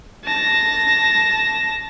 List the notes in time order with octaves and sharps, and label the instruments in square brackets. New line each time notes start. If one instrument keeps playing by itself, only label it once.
[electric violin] A5 A#6